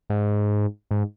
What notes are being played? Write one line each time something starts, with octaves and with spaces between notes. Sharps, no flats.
G#2
G#2